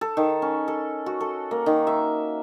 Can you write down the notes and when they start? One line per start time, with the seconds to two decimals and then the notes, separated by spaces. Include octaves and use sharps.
0.01 A4
0.17 D#3
0.42 C#4
0.68 A4
1.06 F#4
1.21 A4
1.51 A#3
1.66 D#3
1.87 E5